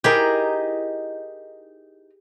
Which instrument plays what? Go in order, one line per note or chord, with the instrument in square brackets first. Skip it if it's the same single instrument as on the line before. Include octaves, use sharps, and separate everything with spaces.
[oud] D#4 E4 A#4 [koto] G4 G#4